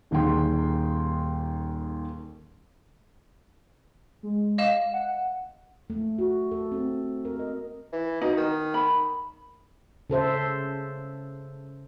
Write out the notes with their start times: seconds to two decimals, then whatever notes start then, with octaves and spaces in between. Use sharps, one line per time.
0.11 D#1 D#2 D#3 G#4 G5 C6
4.23 G#3
4.58 D#5 F5 E7
4.93 F#5
5.90 A3
6.18 F#4
6.51 A4
6.72 C4
7.25 A#4
7.39 D#5
7.92 E3
8.21 B2 D#4
8.37 D#3
8.74 B5
10.10 C#3 A4 C5 E5